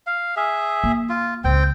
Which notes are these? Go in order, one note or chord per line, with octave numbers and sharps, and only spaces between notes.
F5
G#4 E5
A#3
F4
C#2 C4 G5